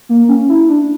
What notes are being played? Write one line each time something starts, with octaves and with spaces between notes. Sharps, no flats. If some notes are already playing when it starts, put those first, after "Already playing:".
A#3
C#4
E4
D4